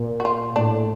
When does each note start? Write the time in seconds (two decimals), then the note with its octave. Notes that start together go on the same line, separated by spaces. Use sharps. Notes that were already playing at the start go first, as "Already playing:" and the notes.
Already playing: A#2
0.20 F#4
0.25 F4
0.56 A2 D4